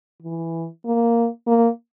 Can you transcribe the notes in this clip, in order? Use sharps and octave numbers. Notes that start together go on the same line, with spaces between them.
E3
A#3
A#3